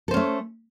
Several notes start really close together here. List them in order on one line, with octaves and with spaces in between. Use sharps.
A4 C5 C#4 A3